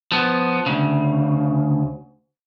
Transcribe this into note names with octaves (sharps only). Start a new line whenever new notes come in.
F3 B3
D2 C#3